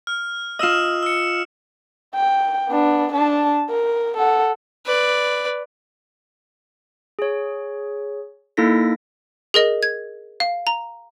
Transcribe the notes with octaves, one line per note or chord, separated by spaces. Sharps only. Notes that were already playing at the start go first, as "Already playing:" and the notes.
F6
F4 D#5 D#6 E6 E7
E6 C#7
G5
B3 D4
D4 A5
A#4
A4 F#5
B4 D5
G#4 C#5
A#3 D#4 E4 A4 A#6 B6
G#4 A#4 D#5
G#6
F5
A#5